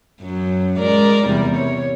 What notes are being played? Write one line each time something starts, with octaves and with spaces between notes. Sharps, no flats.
F#2 F#3
G#3 A#4 D5
E2 C3 G3
C#5